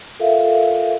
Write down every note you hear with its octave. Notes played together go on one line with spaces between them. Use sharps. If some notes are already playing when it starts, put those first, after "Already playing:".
F4 A4 A#4 E5 F5